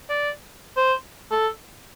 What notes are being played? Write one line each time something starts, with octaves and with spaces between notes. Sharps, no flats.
D5
C5
A4